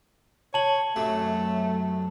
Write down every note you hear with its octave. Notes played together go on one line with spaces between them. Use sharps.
C#5 A5 F#7
F#2 C3 F#3 A3